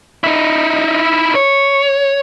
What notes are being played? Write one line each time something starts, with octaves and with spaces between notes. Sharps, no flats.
D#4 E4
C#5